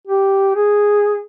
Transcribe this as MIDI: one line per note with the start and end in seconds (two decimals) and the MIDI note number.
0.07 0.53 67
0.55 1.22 68